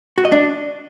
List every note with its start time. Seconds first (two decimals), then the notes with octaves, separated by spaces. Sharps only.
0.18 F#4
0.25 D#5
0.32 D4